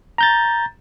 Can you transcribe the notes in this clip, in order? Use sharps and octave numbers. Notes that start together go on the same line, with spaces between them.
A#5 G6 A6